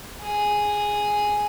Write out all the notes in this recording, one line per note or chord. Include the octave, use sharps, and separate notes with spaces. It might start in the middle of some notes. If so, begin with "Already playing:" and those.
G#4